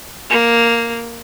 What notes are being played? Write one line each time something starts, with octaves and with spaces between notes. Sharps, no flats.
A#3